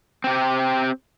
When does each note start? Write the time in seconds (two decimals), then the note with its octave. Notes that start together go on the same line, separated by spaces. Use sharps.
0.24 C4 G4